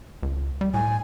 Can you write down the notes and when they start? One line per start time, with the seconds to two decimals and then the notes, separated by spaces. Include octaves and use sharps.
0.23 C#2
0.61 G3
0.74 A2 G#5